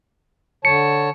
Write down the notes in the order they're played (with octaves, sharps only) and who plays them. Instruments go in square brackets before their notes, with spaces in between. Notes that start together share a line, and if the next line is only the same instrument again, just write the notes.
[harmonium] D3 C#5 A5 [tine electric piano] C#7